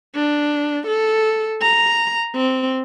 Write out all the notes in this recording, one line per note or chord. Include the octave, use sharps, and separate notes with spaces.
D4
A4
A#5
C4